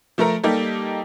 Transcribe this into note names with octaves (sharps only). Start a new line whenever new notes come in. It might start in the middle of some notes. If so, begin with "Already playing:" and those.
F3 A3 A4 A#4 A#5
G3 A#3 D#4 G4 A4